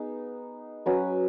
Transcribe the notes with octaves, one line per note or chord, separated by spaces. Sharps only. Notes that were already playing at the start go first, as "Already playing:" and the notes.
Already playing: B3 D#4 G#4
F#3 C#4 B4